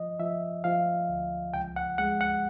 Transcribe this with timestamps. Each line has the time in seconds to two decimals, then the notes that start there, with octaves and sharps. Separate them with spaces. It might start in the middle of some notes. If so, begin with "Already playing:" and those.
Already playing: F3 D#5
0.19 F3 E5
0.64 F3 F5
1.09 D2
1.54 C#2 G5
1.76 F#5
1.98 G#3 F#5
2.21 F#5